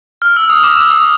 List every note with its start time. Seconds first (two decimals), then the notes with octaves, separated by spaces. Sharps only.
0.22 F6
0.36 E6
0.50 D#6
0.64 D6
0.77 D6
0.90 D#6